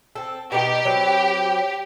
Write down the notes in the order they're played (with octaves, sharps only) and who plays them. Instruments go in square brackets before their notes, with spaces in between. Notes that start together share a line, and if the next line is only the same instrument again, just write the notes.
[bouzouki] C4 A4
[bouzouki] B2 D#4 [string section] G4
[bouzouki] F#3 C4 B4